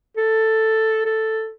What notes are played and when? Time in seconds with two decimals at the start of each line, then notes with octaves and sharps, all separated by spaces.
0.17 A4
1.05 A4